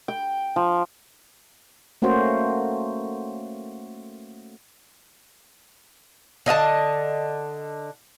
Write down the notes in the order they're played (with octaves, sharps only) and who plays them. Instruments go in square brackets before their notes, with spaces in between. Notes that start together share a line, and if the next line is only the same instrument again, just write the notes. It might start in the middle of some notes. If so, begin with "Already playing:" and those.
[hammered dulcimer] G5
F3
[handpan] A3 A#3 C#4 F#4 C5
[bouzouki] D3 D#5 F5 A5